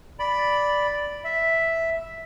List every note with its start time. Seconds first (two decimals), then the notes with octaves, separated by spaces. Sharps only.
0.19 D5 B5
1.24 E5